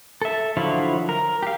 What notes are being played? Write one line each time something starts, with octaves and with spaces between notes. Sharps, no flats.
A4 E5
D3 F3 F#3 E4 F5
A#4
G4 F5